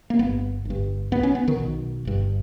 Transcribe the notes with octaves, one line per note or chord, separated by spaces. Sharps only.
A#3
G1 G2 B3
G1 G2
B1 B2 B3
C#4
B3
D#3
B1 B2
G1 G2